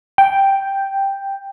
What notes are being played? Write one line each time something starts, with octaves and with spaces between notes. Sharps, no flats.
G5